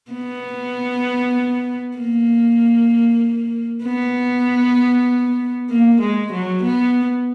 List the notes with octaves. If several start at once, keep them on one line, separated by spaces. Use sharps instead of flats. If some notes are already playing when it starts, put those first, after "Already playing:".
B3
A#3
B3
A#3
G#3
F#3
B3